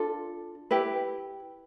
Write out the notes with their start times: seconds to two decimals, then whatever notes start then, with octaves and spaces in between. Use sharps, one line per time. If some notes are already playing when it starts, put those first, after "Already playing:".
Already playing: D4 F4 A4
0.71 E4 G4 B4